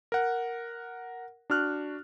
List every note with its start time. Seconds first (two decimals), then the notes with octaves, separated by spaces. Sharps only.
0.12 A#4 F#5
1.50 D4 F#4 F6 F#6